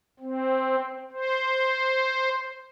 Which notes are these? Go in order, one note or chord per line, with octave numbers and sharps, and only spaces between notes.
C4
C5